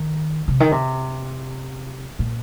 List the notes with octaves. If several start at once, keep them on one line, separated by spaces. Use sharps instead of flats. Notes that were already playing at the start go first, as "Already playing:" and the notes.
Already playing: D#3
C3
D#3
C3
A#2